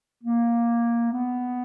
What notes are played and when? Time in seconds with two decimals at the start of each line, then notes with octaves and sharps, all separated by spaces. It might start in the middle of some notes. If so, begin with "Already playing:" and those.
0.23 A#3
1.12 B3